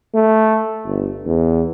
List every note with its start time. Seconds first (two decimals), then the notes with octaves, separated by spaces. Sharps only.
0.15 A3
0.86 G1
1.26 E2